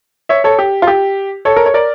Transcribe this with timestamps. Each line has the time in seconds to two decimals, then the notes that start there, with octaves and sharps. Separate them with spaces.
0.29 C#5 E5
0.44 A4 C#5
0.59 G4
0.82 F4
0.87 G4
1.45 A4 C#5
1.56 A#4
1.66 C#5
1.74 A#4 D5